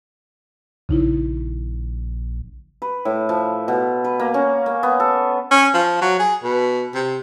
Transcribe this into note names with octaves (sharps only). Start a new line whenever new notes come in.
A#1 C#3 D#4 E4
B4
A2
F3
B2
B4
A#3
C#4
A#3
B3
A4
C#4
F3
F#3
G#4
B2
C3